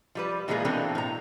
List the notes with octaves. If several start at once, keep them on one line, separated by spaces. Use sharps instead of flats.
F3 G3 B4
A#2 E3 F3 G#3 A#3 G#4
B2 E3 A#3 C4 D4 A4
A2 A#5